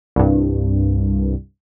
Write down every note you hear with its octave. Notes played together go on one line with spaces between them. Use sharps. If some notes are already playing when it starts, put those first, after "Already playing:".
C2 G2